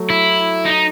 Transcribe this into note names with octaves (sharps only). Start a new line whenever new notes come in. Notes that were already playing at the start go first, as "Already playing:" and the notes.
Already playing: F#3 A3
E4
D#4